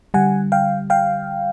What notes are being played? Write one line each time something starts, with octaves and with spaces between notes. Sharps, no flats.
D3 G3 F#5 G#5
F5 G5
F5 G5